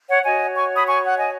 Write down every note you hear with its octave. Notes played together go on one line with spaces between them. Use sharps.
C#5 F#5
F#4 C#5 D#5 G#5
G#5 C#6
B5 D#6
G#5 C#6
F#5
D#5 G#5